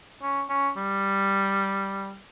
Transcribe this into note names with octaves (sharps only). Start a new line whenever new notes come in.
C#4
C#4
G3